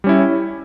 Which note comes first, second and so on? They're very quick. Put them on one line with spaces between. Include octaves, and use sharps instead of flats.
G3 C#4 E4